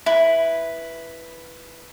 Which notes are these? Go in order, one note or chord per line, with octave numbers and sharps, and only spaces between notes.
E4 B4